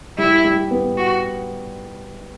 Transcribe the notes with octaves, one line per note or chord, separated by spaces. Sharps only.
G3 E4
G3
B3
F#4